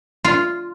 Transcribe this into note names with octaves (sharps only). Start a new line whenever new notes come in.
F4